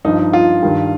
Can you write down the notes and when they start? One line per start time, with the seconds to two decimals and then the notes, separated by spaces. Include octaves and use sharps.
0.05 G2 F3 D#4
0.19 D#4
0.33 F4
0.63 G2 D#3 G3